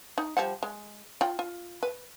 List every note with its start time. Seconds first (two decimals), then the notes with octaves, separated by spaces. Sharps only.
0.18 D#4
0.37 F3 G3 F#5
0.63 G#3
1.21 F4 G5
1.39 F4
1.83 B4